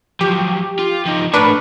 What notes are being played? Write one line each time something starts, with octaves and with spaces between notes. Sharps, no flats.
F3 F#3 G4
F4
F3 D#4
A3 D4 A#4 B4 C#5